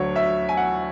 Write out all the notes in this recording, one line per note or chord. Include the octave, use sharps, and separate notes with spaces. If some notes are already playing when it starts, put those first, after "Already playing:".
Already playing: D2 D3 F#3 C#5
E5
G#5
F#5